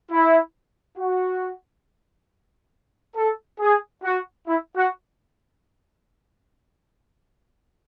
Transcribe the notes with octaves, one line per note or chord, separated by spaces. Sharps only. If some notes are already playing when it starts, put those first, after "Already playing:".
E4
F#4
A4
G#4
F#4
E4
F#4